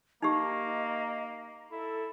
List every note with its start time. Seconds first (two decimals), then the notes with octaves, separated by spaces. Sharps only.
0.22 A#3 D#4 G4 D#5
1.71 E4 A4